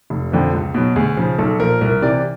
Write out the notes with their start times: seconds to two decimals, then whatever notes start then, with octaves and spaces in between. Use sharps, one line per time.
0.10 F1
0.32 F2 D3 F3
0.53 C#2
0.74 B2 F#3
0.96 D2 G#4
1.17 C#3 F3
1.38 B1 A4
1.60 A#2 F3 A#4
1.81 C2 A#4
2.02 C3 E3 D5